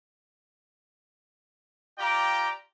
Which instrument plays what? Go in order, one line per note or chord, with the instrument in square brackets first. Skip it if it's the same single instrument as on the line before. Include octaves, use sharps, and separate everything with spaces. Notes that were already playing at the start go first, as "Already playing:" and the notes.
[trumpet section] F4 G4 D5 G5 A#5 D6